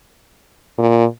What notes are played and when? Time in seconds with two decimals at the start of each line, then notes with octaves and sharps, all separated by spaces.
0.78 A#2